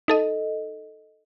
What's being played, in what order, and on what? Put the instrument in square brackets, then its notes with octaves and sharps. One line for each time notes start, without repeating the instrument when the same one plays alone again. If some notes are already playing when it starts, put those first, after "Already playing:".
[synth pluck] D#4 A4 D#5